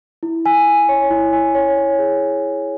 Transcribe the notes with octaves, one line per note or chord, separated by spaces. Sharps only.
E4
G#5
G#5
C#5
E4
G#5
C#5
C#5
G#4